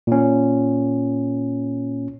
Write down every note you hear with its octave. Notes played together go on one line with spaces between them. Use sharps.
A#2 C#4